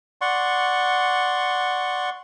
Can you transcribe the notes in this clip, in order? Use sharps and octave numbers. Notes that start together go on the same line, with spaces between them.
D5 F#5 C6 C#6